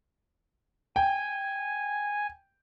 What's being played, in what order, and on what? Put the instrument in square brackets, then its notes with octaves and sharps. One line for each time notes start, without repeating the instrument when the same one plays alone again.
[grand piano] G5 [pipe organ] G#5